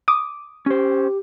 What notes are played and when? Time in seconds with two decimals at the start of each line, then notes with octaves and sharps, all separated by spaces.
0.08 D6 D#6
0.66 C#4 G4 C5